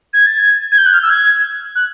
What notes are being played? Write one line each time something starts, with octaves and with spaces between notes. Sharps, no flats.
G#6
A6
G#6
G#6
G6
F#6
F6
E6
G#6
F#6